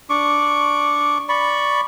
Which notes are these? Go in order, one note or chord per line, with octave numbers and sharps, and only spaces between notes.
D4 C#6 D6
D5 B5 C#6